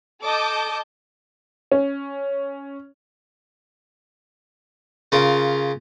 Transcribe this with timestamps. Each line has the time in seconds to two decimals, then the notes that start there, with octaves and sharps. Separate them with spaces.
0.23 A4 D#5 A5 D6 G6
1.72 C#4
5.12 C#3 C#4 F4 A#4